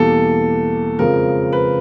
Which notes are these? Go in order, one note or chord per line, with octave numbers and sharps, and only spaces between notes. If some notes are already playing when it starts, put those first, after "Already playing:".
Already playing: E2 B2 G3 A#3 A4
F2 C#3 F3 G#3 A#4
B4